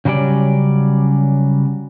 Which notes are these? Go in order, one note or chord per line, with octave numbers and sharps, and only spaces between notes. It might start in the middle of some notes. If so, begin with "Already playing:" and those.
C#3 F#3 G3 C#4 D5